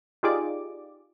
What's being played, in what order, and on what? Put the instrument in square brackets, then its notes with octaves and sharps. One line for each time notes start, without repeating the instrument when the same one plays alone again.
[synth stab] D#4 F4 G4 G#4 D5 D6